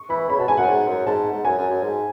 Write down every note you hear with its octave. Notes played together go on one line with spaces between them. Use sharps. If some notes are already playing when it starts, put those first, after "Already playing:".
Already playing: C#6
E3 B5
C#3 B5
B2 A5
G#2 G#5
F#2 F#5
G#2
F#2
G#2 A5
G#2
F#2 G#5
F#2
F#2
G#2